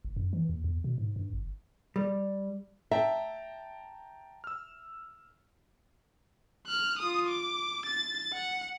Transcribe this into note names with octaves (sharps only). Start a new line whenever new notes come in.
F#1
F#2
E3
D#2
E2
B2
G#2
G2
G1
G3
E5 G5 A5 A#5
E6 F6
F6 F#6
F4 D#6
D6
A6
F#5